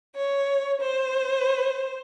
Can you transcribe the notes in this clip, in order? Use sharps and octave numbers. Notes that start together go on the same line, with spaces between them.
C#5
C5